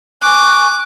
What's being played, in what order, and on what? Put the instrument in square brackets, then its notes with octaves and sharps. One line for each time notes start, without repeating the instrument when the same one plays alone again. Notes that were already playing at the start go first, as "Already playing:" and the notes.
[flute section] G#5 C#6 [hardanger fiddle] D6 [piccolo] F#6